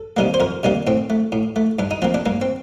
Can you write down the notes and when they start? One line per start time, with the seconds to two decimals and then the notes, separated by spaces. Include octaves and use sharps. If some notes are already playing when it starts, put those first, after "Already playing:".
Already playing: A4
0.17 C3 D#3 G3 A#3
0.34 C5
0.40 F2 A#4
0.63 C3 D#3 G3 A#3
0.87 A2 C4
1.10 A3
1.32 A2
1.56 A3
1.79 G2 D4
1.91 D#4
2.02 F3 A#3 C4
2.14 D4
2.26 G2 A#3
2.42 C4